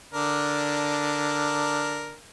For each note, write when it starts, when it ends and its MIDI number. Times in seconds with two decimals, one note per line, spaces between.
0.13 2.17 50
0.13 2.17 62
0.13 2.17 70